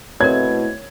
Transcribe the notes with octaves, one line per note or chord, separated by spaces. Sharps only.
B2 A3 C4 E4 A#4 C#5 G#6